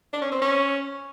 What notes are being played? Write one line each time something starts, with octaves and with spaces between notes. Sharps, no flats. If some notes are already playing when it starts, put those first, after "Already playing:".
D4
C#4
C4
C#4